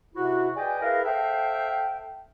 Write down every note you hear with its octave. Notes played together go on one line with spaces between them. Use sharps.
G#2 C3 E4 F#4
G#4 B4 D5 D#5 G5 G#5
E4 G#4 A#4 B4 D#5 F5
A4 C5 E5 F5 G5